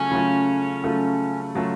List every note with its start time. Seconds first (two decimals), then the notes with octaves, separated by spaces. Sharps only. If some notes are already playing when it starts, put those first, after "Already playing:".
Already playing: C#3 F#3 A3 C#4 F4 A4
0.12 C#3 F#3 A3 F4 A4
0.84 C#3 F#3 A3 F4 A4
1.55 C#3 F#3 A3 F4 A4